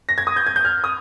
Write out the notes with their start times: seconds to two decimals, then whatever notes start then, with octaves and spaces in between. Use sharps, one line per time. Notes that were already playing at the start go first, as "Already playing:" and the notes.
0.09 A#6
0.18 G#6
0.27 D#6
0.36 G6
0.47 G#6
0.56 G6
0.65 F6
0.84 D#6